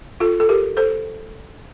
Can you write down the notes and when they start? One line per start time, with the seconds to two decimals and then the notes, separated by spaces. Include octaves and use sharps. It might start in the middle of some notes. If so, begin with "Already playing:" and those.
0.20 F4 A4
0.40 A4
0.49 G4 A#4
0.77 A4 C5